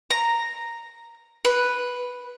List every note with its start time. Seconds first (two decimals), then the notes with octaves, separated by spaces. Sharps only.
0.11 A#5
1.45 B4